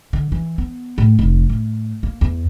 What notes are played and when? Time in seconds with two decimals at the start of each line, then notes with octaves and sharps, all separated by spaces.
0.13 D3
0.32 E3
0.58 B3
0.98 A2
1.19 F1
1.49 A2
2.03 A#3
2.21 E2